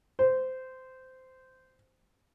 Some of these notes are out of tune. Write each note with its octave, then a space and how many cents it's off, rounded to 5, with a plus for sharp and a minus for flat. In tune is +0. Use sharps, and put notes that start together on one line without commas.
C5 -15